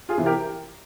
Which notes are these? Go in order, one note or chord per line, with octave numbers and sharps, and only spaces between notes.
F4 G#4
C3 E3
G4 A#4